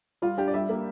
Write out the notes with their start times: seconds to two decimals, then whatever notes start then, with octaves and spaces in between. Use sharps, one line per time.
0.22 G3 F4
0.38 D4 G4
0.48 D5
0.54 G3 E5
0.69 A#3